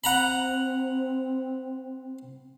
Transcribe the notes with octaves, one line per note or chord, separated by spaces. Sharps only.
C4 F#5 A#5 B5